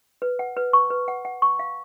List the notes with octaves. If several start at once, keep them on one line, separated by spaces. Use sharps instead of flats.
B4
F#5
B4
C#6
B4
F#5
F#5
C#6
F5